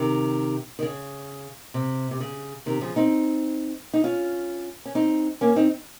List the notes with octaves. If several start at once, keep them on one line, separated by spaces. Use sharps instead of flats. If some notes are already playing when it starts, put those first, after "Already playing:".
Already playing: C3 D#3
D#3
C#3
C3
C3
C#3
C3 D#3
C#3 F3
C4 D#4
D#4
C#4 F4
C#4
C4 D#4
A#3 C#4
C4 D#4